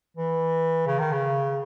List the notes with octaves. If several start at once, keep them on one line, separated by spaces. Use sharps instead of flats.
E3
C#3
D#3
C#3